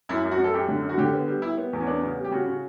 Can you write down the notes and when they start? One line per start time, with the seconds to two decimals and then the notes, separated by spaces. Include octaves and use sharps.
0.09 F#2 E4
0.24 F#2
0.31 F#4
0.38 F#2
0.44 A4
0.53 F#2 G4
0.68 D3
0.83 F#2
0.89 F#4
0.98 D3 G4
1.13 B3
1.28 G3
1.42 G3 E4
1.57 B3
1.73 E2
1.80 C#4
1.87 B3 D4
2.02 C#3
2.17 G3
2.24 G4
2.31 C#3 F#4
2.46 C#3